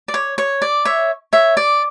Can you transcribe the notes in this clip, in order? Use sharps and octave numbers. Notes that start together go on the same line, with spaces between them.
D5
C#5
C#5
D5
C#5 E5
C#5 E5
D5